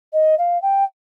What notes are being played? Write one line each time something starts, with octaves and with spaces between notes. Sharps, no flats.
D#5
F5
G5